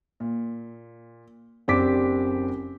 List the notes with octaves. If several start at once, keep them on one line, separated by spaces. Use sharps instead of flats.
A#2
F#1 C4 D4 G4 D6 B6